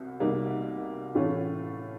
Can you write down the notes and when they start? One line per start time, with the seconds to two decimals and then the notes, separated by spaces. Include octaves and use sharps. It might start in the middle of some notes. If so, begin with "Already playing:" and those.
Already playing: C2 B2
0.20 C2 B2 G3 A#3 D#4
1.15 A2 E3 A3 C#4 F4